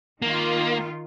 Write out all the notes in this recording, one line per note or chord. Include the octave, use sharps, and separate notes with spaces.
D#3 A#3 F4